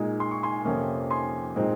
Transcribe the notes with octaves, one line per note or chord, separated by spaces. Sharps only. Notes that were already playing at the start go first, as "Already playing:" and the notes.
Already playing: A#2 G#3 D#4
C6
C#6
G#5 C6
F2 C3 F3 A#3 C#4
G#5 C6
A#2 G#3 C4 D#4